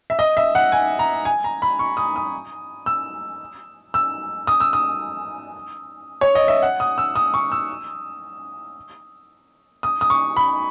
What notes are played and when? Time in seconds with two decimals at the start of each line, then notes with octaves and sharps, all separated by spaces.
0.10 E5
0.19 D#5
0.37 E5
0.55 F#5
0.72 G#5
0.99 A#5
1.25 G#5
1.44 A#5
1.62 B5
1.79 C#6
1.97 D#6
2.16 D#6
2.86 E6
3.94 E6
4.47 D#6
4.60 E6
4.73 D#6
6.21 C#5
6.35 D#5
6.48 E5
6.62 F#5
6.80 D#6
6.98 E6
7.16 D#6
7.34 C#6
7.52 E6
9.83 D#6
10.01 D#6
10.10 C#6
10.37 B5